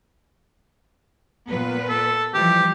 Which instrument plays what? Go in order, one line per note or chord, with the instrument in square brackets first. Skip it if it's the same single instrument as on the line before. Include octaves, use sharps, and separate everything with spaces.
[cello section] A#2 B3 B4
[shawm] A4
[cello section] E3 F3 G3 [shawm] G4